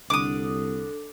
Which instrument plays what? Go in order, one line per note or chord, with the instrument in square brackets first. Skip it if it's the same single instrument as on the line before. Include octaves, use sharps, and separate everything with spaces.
[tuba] C2 [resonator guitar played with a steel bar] D3 [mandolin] D6 D#6